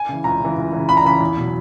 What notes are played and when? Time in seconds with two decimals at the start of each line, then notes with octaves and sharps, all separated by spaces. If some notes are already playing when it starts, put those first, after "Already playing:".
Already playing: G#5
0.09 C#3 E3
0.24 C#2 A#5
0.40 C#3 E3
0.57 C#2
0.73 C#3 E3
0.89 C#2 B5
0.97 A#5
1.05 C#3 E3 B5
1.21 E2
1.37 B2 F#3